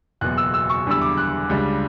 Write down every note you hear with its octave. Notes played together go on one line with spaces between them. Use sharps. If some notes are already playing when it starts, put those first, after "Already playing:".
F#1 E2 B2 F#6
E6
E6
C#6
F#1 E2 D3 G3 E6
D6
F#6
C#2 C#3 G3 D4